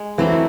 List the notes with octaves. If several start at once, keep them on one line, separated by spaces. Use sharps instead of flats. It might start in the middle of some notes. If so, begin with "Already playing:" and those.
Already playing: G#3
E3 F#3 A3 C4 E4